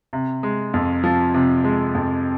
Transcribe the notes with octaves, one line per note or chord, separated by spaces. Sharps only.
C3
G#3
F2
F3
C3
G#3
F2